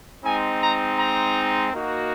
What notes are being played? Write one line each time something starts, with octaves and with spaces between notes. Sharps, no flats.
G#3 C4 D#4 G#5
A#5
A#5
A#3 D#4 F#4